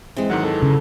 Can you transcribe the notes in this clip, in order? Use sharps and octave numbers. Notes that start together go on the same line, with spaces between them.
E3 G#3 C4
G#2 D#3 F#3 F#5
A4
C#3